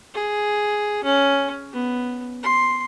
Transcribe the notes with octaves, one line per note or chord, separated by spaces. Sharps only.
G#4
C#4
B3
C6